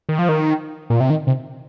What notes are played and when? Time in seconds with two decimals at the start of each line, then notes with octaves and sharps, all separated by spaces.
0.09 D#3
0.19 F3
0.29 D#3
0.90 A#2
1.00 C3
1.10 D#3
1.27 C3